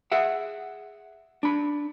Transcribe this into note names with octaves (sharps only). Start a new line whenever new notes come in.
G#4 E5 F#5
D4 B5